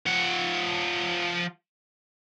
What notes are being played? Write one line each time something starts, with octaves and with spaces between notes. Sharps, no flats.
F3 F#5